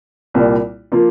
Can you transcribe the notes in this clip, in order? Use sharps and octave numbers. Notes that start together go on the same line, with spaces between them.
C2 A#2 G3 A#3 F4
F3 A#3 F4